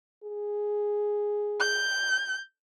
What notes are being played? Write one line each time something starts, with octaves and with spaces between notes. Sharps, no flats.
G#4
G6